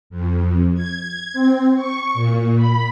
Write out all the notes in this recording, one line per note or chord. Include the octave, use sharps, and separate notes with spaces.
F2
G#6
C4
C#6
A#2
B5